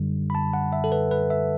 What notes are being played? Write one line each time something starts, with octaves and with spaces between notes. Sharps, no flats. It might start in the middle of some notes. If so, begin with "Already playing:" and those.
Already playing: F#2 D3 G3
B5
A5
F#5
E5
A4
B4
B4
E5